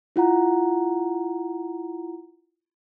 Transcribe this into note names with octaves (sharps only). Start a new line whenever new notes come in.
E4 F4 F#5 A#5